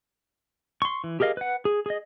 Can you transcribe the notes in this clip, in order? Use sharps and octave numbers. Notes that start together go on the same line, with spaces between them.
C6 C#6
E3
G4 G#4 A#4 D#5 F5
B4 F#5
G#4
G#4 D#5